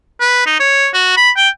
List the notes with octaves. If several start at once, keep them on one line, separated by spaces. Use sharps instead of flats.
B4
D#4
C#5
F#4
B5
G5